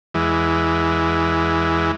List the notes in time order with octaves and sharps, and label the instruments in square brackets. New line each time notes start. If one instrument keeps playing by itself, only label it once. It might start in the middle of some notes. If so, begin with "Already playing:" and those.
[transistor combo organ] E2 E3 G#3